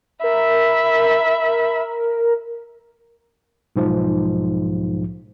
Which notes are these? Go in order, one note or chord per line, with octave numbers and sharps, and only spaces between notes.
A#4 E5 B5
B1 G#2 F3